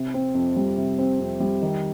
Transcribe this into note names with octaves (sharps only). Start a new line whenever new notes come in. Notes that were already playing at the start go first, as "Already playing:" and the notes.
Already playing: C3
C4
F2
G3
C3
C4
F2
G3
D#3